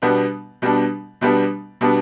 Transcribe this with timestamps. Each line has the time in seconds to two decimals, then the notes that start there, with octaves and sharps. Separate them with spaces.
0.02 B2 G3 B3 D4
0.62 B2 G3 B3 D4
1.21 B2 G3 B3 D4
1.81 B2 G3 B3 D4